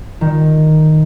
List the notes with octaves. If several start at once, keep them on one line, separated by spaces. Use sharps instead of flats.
D#3